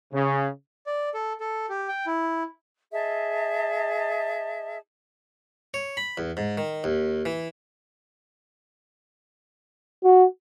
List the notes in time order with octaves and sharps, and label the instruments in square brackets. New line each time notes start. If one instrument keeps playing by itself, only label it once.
[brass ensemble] C#3
[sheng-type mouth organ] D5
A4
A4
G4
G5
E4
[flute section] G#4 D#5 E5 A5
[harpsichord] C#5
B5
E2
G#2
D#3
D#2
E3
[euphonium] F#4